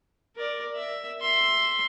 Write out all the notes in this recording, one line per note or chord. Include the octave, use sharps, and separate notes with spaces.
A#4 D5
E5
E5 C6